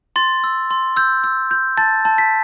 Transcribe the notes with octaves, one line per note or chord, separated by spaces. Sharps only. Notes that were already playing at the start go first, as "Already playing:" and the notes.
C6 A6
E6
C6
E6 G6
E6
G6
A5 A6
A5
B6